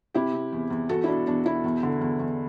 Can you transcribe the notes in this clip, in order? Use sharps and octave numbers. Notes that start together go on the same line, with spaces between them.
C3 E4 G4
C3
E2
E2
E2 F#4 A4
E4
B2 D4
E2 D4
B2 E4
E2
D3
E2
E2